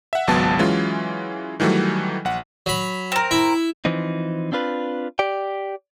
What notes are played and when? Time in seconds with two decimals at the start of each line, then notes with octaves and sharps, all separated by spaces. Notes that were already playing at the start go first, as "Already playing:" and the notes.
0.13 E5 F#5
0.27 G#1 C#2 F#3 B3 A5
0.59 E3 F#3 G#3 C#4 F4
1.60 D#3 E3 F#3 G3 A3
2.25 A#1 F#5
2.66 F#3 B5
3.12 C4 A#4
3.31 E4
3.85 E3 F3 C4 D#4
4.52 C4 D4 F4 B4
5.19 G4 D5 G5